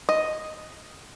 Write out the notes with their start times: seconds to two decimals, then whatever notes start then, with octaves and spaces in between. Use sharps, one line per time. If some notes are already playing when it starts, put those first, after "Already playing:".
0.09 D#5